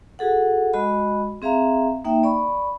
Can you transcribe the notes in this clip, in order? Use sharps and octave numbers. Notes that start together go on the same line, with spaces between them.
F#4 G#4 A4 F#5
G#3 F#4 D#5 B5
C4 G#4 E5 F5 A#5
A#3 D#4 E5 G5
D5 B5 C#6